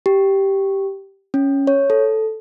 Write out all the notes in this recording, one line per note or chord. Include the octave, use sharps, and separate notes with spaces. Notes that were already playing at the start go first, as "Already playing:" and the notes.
G4
C#4
C#5
A4